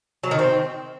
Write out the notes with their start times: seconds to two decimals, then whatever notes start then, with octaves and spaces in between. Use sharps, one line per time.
0.24 F#3
0.31 D#3
0.39 C4